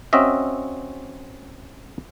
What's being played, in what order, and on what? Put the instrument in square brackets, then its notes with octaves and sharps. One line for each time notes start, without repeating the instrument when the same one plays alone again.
[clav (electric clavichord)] C4 C#4 F#4 D#5 E5